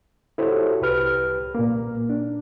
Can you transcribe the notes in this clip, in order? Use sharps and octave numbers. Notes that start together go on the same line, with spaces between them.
E4 F#4 G4 A4 C5 C#5
C2 G4 B4 F6
A#2 A#3
D4